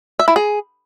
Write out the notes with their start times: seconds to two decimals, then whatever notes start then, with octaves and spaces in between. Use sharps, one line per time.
0.19 E5
0.28 E4
0.36 G#4